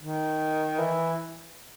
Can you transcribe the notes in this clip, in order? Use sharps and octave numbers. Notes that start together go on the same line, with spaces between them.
D#3
E3